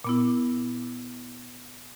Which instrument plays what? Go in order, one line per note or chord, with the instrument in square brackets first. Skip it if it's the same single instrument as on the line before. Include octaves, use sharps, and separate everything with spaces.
[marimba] A#2 B3 E4